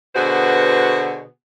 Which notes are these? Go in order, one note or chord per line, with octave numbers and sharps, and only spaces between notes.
B2 D3 B3 F#4 G#4 C5